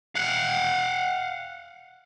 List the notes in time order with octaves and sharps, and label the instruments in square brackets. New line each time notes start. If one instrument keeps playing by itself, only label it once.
[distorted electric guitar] F5 F#5